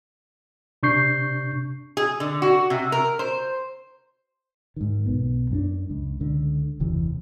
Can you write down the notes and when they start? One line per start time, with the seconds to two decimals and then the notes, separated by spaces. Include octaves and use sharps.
0.83 C3 D4 C#6 G6 C7
1.97 G#4
2.20 D3
2.42 F#4
2.70 C3
2.92 A#4
3.19 C5
4.76 G#2 D#3
5.06 B1 B3
5.51 F#2 C#4 D4
5.90 C#2
6.20 C#2 D3
6.80 F#1 D#2 C3 E3